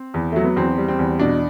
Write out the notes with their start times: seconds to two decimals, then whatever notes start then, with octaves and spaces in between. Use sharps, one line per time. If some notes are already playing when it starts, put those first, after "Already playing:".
Already playing: C4
0.14 E2
0.32 F#3 A3
0.44 B3
0.56 E2 C4
0.78 G3
0.88 C4
0.99 E2
1.19 B2 D4